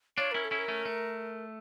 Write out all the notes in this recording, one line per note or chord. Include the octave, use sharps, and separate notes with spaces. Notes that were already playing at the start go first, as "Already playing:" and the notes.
D4 F4 C#5
C#4 E4 A#4
A4
C#4 E4
A#4
A3 C#4
A3